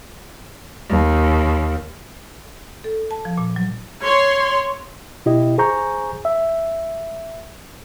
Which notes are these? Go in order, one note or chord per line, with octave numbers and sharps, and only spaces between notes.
D#2
A4
A5
F3
A#2
F#3
C#5 C6
B2 E4 G4 D#5
G#4 C5 G#5 A#5 C#6 G6
E5